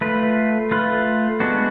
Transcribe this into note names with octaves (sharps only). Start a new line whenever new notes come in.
A3 F4 B4
A3 F4 B4
G#3 B3 D4 F#4